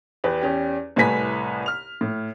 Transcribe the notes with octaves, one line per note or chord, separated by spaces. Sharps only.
E2 G4 B4
E2 C#4 G4
C2 A2 A3 B4 G#5 B6
F6 F7
A2